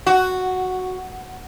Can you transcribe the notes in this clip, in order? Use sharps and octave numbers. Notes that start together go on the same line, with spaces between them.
F#4